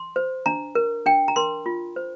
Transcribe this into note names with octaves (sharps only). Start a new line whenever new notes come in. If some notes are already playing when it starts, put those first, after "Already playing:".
Already playing: C6
C5
D4 A#5
A#4
D4 G5
A#5
A#4 C6
F4
C5